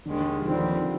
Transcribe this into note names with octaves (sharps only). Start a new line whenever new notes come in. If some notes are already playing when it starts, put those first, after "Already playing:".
D#2 D3 D#3 G#3
F3
D#2 D3 D#3 G3 C4